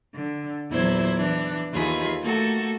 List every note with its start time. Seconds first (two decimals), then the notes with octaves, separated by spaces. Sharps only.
0.13 D3
0.71 E2 A#2 F#3 E4 C5 G#6
1.16 E3 D4 F#6
1.72 D#2 E3 F4 G#4 B5
2.22 A3 A#3 F#4 A4